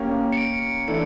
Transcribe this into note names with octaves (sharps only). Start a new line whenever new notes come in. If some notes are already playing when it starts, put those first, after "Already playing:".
Already playing: A#3 C#4 G4
C#7
D7
E3 A3 D4 A4 C#7